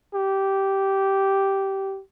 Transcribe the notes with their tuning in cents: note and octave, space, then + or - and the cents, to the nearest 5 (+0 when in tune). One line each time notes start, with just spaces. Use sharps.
G4 -10